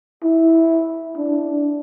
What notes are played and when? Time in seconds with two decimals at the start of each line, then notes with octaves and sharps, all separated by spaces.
0.23 E4
1.17 D4